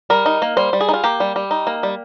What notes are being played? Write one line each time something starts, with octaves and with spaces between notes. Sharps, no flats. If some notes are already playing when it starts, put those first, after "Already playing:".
G3 A#4
D#4
A#3
G3 C5
G3
G#4
D#4
F4
A#3 G4
G3
G3
D#4
A#3
G3